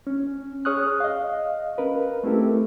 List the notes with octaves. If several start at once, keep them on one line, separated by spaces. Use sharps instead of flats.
C#4
G#4 C#5 C#6 D#6 F6 F#6
D#5 F5
C#4 A#4 B4
A3 C4 E4 G4 A4 A#4